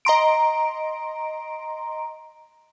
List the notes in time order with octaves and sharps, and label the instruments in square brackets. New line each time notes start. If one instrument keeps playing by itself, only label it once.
[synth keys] D#5 A#5 C6 D7